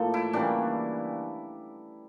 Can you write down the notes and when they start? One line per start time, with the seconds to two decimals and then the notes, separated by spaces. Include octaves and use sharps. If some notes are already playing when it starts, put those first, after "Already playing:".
Already playing: A2 F3 A#3 A4
0.14 E4
0.33 C#3 E3 G3 A#3 D4